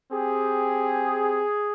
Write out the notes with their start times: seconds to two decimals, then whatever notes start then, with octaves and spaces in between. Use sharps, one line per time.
0.12 C4 G4 G#4